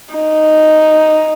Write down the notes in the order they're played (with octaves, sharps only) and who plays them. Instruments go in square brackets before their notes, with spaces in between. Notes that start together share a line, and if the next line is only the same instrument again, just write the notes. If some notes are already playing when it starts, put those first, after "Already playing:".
[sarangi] D#4